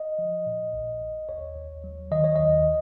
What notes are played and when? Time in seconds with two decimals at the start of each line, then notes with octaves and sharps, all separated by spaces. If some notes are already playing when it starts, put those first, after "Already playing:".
Already playing: D#5
0.18 F3
0.46 A#2
0.74 A#1
1.02 A#1
1.29 D#2 C#5
1.56 D#2
1.84 F#3
2.11 D#3 D#5
2.24 C#5
2.36 D#2 D#5